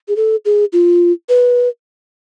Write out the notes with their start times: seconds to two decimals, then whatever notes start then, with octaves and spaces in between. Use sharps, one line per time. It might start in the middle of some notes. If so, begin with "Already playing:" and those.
0.08 G#4
0.16 A4
0.45 G#4
0.73 F4
1.29 B4